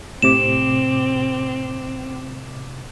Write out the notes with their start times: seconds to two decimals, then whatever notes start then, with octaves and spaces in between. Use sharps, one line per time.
0.22 A2 C3 C4 D6 E7